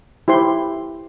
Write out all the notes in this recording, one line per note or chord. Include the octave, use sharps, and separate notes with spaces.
E4 G4 C5 C6